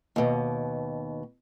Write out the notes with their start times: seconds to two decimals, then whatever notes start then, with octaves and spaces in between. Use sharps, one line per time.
0.16 D#2 B2